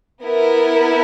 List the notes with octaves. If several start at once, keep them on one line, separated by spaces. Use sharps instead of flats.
B3 E4 A#4